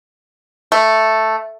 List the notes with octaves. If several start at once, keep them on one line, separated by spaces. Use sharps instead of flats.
A3